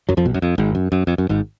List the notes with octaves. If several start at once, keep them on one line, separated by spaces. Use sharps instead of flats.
F#2 F#3
F2 F3
B1 B2
F#2
F2
G#1 G#2
F#2
F#2
F2
F#2
G#1 G#2